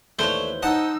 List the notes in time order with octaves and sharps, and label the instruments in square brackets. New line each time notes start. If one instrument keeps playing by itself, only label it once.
[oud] D#2 E3 C#5 [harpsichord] A3 D4 [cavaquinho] C5
[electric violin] D#4 E6 [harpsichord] D#5 F#5 A5